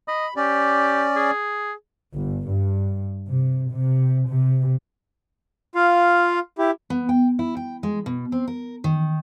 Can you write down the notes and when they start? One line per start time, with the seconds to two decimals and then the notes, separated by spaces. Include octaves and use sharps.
0.08 D#5 B5
0.36 C#4 G4 D5
1.16 G#4
2.15 G1
2.46 G2
3.28 C3
3.71 C3
4.28 C3
5.75 F4 F5
6.58 E4 G4
6.90 B3
7.09 G5
7.39 E4
7.57 G5
7.83 G#3
8.06 B2
8.32 C4
8.48 A#4
8.84 D#3